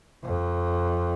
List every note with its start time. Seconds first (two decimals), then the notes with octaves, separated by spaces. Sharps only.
0.24 F2